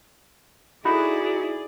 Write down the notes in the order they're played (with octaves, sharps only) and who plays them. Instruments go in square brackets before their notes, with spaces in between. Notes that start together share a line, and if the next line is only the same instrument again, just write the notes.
[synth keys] D#4 F#4 [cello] E4 [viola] G#4 D5 [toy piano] A4 B5